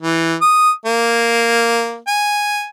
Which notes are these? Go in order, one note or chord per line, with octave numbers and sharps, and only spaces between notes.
E3
D#6
A#3
G#5